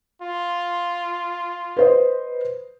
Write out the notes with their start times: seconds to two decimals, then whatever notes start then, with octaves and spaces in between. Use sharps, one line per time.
0.22 F4
1.77 B4 C5 D#5